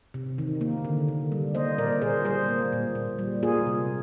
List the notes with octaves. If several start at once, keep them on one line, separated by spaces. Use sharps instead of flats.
C3
D#3
A#3
D3
D3
G3
A#3 C5 D#5
A#2 A#4 D5
A#2 G#4 C5
G3 G#4 C5
A#3
A#2
A#2
G3
A#3 F4 G#4
C3